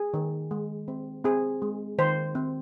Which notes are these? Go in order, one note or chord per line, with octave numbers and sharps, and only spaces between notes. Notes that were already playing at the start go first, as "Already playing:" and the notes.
Already playing: G#4
D#3
G#3
C4
C4 G#4
G#3
D#3 C5
C4